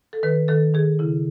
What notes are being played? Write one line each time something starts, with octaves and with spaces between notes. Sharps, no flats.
A4
D#3 B4
D#3 A4
D#3 G#4
C#3 E4